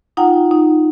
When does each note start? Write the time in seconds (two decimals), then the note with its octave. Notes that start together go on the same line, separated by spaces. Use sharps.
0.17 D#4 F4 F#5 G5 A#5
0.51 D#4